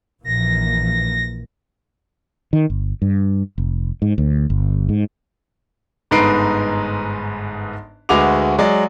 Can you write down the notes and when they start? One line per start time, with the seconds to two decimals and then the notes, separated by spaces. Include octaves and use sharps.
0.25 A#1 E3 A#3 A#6
2.53 D#3
2.70 G1
3.02 G2
3.58 F1
4.02 G#2
4.18 D2
4.50 G1
4.89 G#2
6.11 G1 G#2 D#4 B4 C7 D7
8.09 D2 G#3 F#4 B4 D6 F7
8.58 F#3 G#3 D5